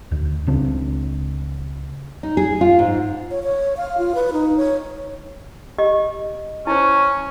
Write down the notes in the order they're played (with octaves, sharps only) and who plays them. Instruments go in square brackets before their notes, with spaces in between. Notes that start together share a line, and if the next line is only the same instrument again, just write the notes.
[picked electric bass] D2
C#2 C#3 C4 D4
[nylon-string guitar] D#4
G#4
F4
G#2
[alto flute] C#5
C#5
F5
F4
B4
D#4
C#5
[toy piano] G4 D#5
[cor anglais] C#4 [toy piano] E4 C5